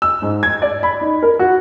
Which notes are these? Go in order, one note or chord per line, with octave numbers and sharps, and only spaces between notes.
E6
G#2
G#6
D5
B5
D#4
A#4
F#4